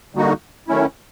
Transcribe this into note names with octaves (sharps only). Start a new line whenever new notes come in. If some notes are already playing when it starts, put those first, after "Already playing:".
D3 G3 A#3 D#4 F#4
D#3 F#3 A3 C#4 E4